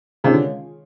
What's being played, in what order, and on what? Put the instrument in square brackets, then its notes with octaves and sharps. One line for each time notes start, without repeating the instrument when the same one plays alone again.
[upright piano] C3 [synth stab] D#3 G#3 C#4 F4 G#4
[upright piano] D3